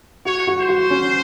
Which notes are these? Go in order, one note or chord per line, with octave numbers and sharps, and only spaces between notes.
F#4 C#5
F#4
C5
F#4
C#4